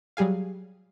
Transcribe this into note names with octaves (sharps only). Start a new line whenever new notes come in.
F#3 G3 G4 G#4 F5